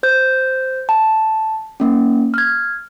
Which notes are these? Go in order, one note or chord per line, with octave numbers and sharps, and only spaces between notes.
C5 G6
A5
A#3 C#4
F6 G#6